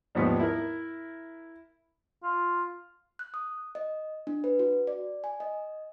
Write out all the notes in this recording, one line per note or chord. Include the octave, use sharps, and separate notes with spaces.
D#2 G#2 F3 G3 B3
E4 A#4
F4
F#6
D#6
D#5
D4
B4
F#4
D5
G#5
D#5